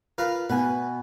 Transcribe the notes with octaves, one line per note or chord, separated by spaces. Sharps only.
F4 A#4 B4
B2 B4 G#5